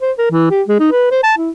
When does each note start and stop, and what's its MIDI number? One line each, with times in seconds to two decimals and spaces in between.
0.02 0.12 72
0.18 0.27 70
0.31 0.49 52
0.51 0.62 67
0.68 0.79 56
0.80 0.88 63
0.92 1.06 71
1.11 1.23 72
1.23 1.34 81
1.38 1.50 64